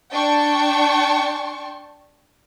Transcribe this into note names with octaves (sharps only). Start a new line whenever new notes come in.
D4 G5 A5 C#6